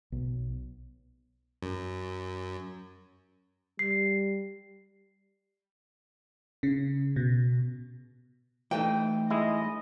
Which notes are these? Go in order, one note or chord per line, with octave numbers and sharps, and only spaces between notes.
B1
F#2
G3 C7
C#3
B2
E3 A3 D#4 G5
G#3 E4 D#5